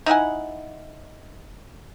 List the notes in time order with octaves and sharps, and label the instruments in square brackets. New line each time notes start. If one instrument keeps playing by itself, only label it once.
[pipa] D#4 E4 F#5 G#5